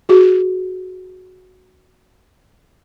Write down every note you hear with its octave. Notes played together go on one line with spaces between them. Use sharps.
F#4 G#4